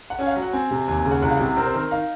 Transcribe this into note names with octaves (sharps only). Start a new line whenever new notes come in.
F#5
C#4 G#5
F5
F#5
F#3
F#5
C4 G#5
C3
D#2 G#5
G#5
C#3
F#5
C2 F#5
F5
C3 F#5
C4 A#4
C5
D#3 A#4
D#4 F5